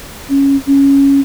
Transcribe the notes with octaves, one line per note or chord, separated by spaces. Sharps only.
C#4
C#4